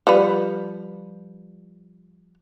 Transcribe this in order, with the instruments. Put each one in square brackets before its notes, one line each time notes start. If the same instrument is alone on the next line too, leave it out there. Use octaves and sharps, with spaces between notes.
[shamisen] F3 G3 B4